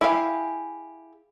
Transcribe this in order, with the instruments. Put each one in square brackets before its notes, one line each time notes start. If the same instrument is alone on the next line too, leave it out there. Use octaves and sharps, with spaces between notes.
[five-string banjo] E4 G4 G#4 F5